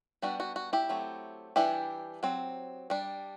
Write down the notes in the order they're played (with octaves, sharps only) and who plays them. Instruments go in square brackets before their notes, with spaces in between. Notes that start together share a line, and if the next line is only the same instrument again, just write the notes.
[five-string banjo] G3 B3 D4 F#4
F#4
F#4
E4 G4
F#3 A3 C4
E3 G3 D4 E4 G4
F#3 C4
G3 D4